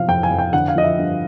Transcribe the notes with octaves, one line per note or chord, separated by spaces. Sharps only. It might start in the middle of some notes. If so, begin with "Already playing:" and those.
Already playing: C3 F3 F5
F2 G5
G#5
F2
G5
D3 F#5
F5
F3 D#5
E5
G2